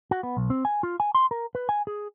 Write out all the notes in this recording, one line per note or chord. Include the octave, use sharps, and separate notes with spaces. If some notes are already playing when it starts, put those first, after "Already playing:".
F#4
B3
B1
C4
G#5
F4
G#5
C6
A#4
B4
G#5
G#4